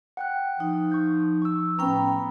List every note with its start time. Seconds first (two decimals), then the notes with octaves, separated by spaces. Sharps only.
0.17 F#5 G5 F#6
0.60 F3 D#4
0.92 C#6 G6
1.42 C#6 E6
1.79 A2 B3 C#4 G5 A#5 B5